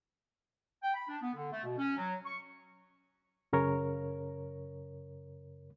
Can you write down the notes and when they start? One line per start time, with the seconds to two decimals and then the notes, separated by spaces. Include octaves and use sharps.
0.83 G5
0.94 B5
1.08 D4
1.22 B3
1.35 D3
1.52 A3
1.64 B2
1.78 C#4
1.97 F#3
2.25 C#6
3.53 F#2 C#3 A#4 C#5